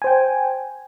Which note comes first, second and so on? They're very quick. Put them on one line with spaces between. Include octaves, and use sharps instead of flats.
G#5 C5 G5